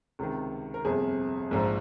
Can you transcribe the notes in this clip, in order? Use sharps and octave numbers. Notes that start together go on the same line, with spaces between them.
C#2 C3 D#3
A#4
G1 F2 C3 G#4
A#1 G#2 F3